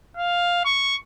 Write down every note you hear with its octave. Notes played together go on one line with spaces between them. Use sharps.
F5
C#6